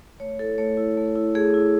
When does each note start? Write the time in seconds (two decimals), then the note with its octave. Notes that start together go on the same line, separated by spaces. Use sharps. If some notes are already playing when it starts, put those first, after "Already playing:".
0.20 A3 C#5
0.39 E4 A4
0.58 A3 C#5
0.77 E4
0.97 A3
1.16 E4
1.35 A3 G#4
1.54 E4